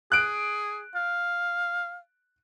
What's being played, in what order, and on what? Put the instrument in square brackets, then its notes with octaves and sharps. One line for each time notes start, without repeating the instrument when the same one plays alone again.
[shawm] G#4 [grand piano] F#6 D7
[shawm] F5